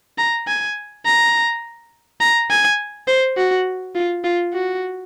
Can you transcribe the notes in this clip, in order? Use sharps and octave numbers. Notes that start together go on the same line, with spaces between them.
A#5
G#5
A#5
A#5
G#5
C5
F#4
F4
F4
F#4